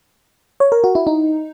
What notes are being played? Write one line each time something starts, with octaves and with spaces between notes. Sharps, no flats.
C#5
A#4
F#4
E4
D#4